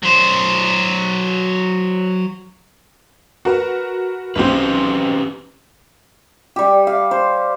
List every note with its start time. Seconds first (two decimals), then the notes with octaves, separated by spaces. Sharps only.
0.03 F#3 C5
3.45 F#4 A#4 B4
4.36 B1 C4 C#4 G4 B4
6.56 G3 G4
6.87 F5
7.11 C5